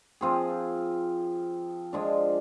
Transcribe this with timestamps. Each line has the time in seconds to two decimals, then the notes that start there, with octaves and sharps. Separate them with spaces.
0.21 F3 C4 F4 G#4
1.93 F3 G#3 D4